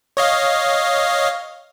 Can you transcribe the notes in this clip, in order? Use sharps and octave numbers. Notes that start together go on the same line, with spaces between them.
C#5 D#5 F5